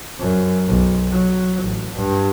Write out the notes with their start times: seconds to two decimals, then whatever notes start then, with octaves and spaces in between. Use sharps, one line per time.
0.20 F#2
0.68 B1
1.12 F#3
1.63 A1
1.96 G2